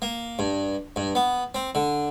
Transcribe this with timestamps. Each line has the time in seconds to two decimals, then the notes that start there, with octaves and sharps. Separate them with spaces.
0.02 A#3
0.39 G2
0.96 G2
1.15 B3
1.54 C4
1.75 D3